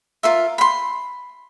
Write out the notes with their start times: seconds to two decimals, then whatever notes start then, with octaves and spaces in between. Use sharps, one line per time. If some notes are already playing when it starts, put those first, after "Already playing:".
0.23 F4 A#4 E5
0.58 B5 C6